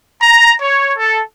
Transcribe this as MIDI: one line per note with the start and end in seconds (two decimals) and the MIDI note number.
0.22 0.54 82
0.62 0.93 73
0.99 1.20 69